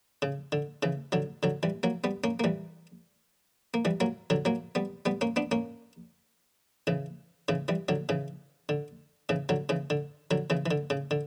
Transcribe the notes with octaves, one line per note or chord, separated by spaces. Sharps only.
C#3
D3
C#3 E3
D3 F#3
D3 F#3
E3 G3
F#3 A#3
G3 B3
A#3 C#4
A#3
E3 G3
A#3
E3 G3
F#3 A#3
D3 F#3
F#3 A#3
G3 B3
G3 B3
A#3 C#4
B3 D4
A#3 C#4
C#3 E3
C#3 E3
E3 G3
D3 F#3
C#3 E3
D3
C#3 E3
D3 F#3
C#3 E3
D3
D3 F#3
C#3 E3
E3
D3
C#3
D3